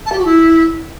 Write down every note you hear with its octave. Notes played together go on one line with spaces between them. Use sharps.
A5
G4
F#4
E4